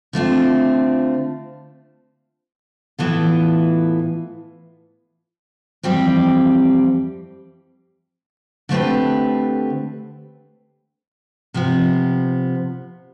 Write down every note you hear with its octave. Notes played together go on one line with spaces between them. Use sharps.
D3 A3 C4 F4
A2 E3 B3 F4 A4
F2 E3 G3 C4 G4
D3 A3 C4 G4 B4
C3 F3 B3